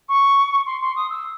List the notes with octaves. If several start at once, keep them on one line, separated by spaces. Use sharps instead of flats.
C#6
C6
C6
D#6
E6